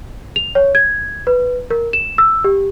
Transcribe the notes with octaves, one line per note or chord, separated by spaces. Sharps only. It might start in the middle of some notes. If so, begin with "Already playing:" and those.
F7
C#5
G#6
B4
A#4
E7
E6
G4